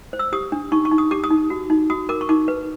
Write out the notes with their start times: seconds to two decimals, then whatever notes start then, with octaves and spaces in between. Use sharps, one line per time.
0.13 C5
0.19 E6
0.33 G4 D#6
0.52 D4
0.72 D#4 C#6
0.85 C#6
0.91 D#4
0.98 D#6
1.11 G4 D6
1.24 D#6
1.30 D#4
1.50 F#4
1.70 D#4
1.90 F#4 D#6
2.09 A#4 D6
2.21 C#6
2.29 D#4 D6
2.48 B4